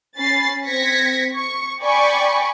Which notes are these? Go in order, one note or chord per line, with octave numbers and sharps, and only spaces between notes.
C#4 B5 A6 C7
C4 G#6 A#6 B6 C#7
C#6
D5 G5 G#5 B5 C#6